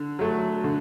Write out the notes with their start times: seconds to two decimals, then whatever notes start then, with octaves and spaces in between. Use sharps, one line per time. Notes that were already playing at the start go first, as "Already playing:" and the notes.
Already playing: D3
0.19 F#3 A3
0.64 D3